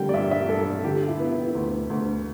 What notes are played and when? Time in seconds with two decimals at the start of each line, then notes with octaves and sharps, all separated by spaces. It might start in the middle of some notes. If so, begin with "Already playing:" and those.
Already playing: D3 G3 G5
0.09 D5
0.14 G2 E5
0.31 E5
0.49 G2 A4
0.84 D3 G4
1.08 E4
1.20 B3
1.32 E4
1.55 D2
1.90 D2